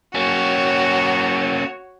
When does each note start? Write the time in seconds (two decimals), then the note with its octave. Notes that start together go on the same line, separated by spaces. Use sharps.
0.15 A#3 C#4 F#4 C#5